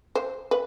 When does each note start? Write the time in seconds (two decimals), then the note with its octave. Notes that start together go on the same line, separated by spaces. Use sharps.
0.15 C5
0.51 B4